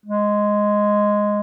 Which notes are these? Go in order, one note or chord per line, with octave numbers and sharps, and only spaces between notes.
G#3